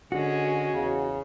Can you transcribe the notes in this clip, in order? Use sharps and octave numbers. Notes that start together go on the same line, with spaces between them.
D3 G#3 C#4 F#4
E2 C#3